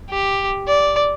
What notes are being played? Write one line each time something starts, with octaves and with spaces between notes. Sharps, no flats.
G4
D5